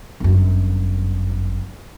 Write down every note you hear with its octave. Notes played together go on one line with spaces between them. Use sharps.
G1 F#2